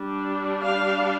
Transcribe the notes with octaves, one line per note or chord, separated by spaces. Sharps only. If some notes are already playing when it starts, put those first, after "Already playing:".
Already playing: G3 D4
F5